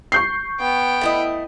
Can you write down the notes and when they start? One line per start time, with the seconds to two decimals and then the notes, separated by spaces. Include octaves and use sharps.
0.12 C#6 G6 C7
0.60 B3 G5
1.01 A3 E4 D#5